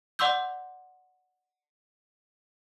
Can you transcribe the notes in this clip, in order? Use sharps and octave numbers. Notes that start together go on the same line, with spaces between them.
D5 F#5 C6 D6 E6 G6